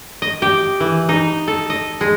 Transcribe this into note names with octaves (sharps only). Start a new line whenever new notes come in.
D#5
G4
E3
D#4
A4
D#5
G#3